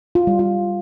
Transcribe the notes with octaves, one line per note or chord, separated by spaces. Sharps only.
F4
G3
F4